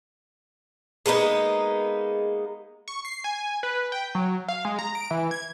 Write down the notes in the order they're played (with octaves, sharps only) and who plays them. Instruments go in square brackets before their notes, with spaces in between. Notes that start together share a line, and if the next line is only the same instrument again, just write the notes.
[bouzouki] G#3 A#3 B3 D#4
[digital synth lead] C#6
C7
G#5
B4
G5
F#3
F5
G#3
A#5
D7
E3
G#6